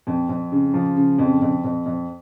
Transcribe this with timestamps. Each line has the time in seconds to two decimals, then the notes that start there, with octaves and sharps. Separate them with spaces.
0.07 F2
0.29 F2
0.52 C#3
0.74 F3
0.96 C#3
1.18 F2
1.42 F2
1.64 F2
1.86 F2